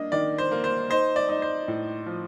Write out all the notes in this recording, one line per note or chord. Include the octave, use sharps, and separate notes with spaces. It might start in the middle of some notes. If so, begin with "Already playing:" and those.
Already playing: A#3 D4 D#5
D#3 D5
C5
A#3
C5
D#4 C5
D5
D#4
C5
A2
F3